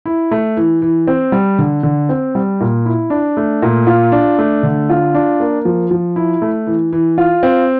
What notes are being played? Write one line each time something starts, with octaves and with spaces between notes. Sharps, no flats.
E4
A3
E3
E3
C4
G3
D3
D3
C4
G3
A#2
E4
D4
A3
A#2
F4
D4
A3
D3
F4
D4
A#3
F3
F3
E4
A3
E3
E3
F4
C4